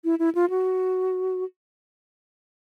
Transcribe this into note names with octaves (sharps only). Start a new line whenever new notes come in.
E4
E4
F4
F#4